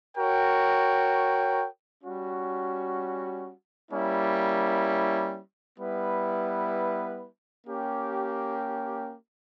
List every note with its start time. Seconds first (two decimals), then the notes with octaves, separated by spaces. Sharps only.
0.16 F#4 A#4 C#5 G5
2.03 G3 C#4 F#4
3.90 G3 A#3 C#4 E4
5.78 G3 B3 E4 B4
7.66 A#3 C#4 G4